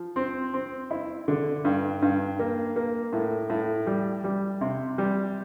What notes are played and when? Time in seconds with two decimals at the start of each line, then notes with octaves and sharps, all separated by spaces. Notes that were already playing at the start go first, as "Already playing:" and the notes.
Already playing: F3
0.16 C4
0.54 C4
0.91 E4
1.28 D3
1.65 G2
2.02 G2
2.39 A#3
2.76 A#3
3.13 A2
3.50 A2
3.87 G3
4.24 G3
4.61 C3
4.98 G3